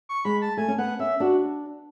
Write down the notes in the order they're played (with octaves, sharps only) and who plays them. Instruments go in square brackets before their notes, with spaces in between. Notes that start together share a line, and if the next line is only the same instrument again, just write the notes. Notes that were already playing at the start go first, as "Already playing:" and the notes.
[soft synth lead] C#6
[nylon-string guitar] G#3 [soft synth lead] B5
[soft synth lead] A5
[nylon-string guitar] A3 [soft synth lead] G#5
[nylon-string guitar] C#4
[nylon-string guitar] B3 [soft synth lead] F#5
[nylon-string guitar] C#4 [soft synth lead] E5
[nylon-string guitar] D4 [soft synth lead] F#4